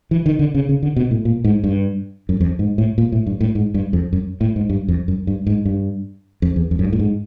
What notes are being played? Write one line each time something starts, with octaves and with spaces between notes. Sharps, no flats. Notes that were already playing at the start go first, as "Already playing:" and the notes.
E3
D#3
D3
C#3
C#3
D3
B2
A2
A#2
G#2
G2
F#2
F2
G#2
A2
A#2
A2
G2
A2
G#2
G2
F2
F#2
A2
G#2
G2
F2
F#2
G2
G#2
G2
F2
E2
F2
F#2
G2
A2
G#2